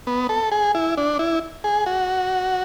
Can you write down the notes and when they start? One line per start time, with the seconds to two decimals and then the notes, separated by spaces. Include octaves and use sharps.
0.07 B3
0.29 A4
0.52 G#4
0.75 E4
0.97 D4
1.19 E4
1.64 G#4
1.86 F#4